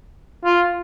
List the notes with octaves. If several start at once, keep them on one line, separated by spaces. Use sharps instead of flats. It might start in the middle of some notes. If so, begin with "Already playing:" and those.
F4